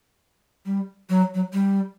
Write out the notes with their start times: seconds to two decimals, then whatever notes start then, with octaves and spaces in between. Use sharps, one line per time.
0.65 G3
1.09 F#3
1.34 F#3
1.53 G3